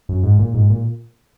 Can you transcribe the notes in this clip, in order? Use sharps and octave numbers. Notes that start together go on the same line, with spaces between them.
F#2
G#2
A#2
G#2
A#2